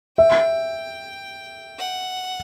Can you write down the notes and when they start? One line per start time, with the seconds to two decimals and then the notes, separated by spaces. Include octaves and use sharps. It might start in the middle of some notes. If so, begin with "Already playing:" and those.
0.18 E5 G5
1.78 F#5